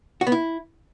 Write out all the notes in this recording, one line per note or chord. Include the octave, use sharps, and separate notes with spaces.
F#4
B3
E4